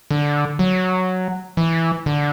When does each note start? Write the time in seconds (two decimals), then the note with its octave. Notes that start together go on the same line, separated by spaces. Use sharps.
0.11 D3
0.59 F#3
1.57 E3
2.06 D3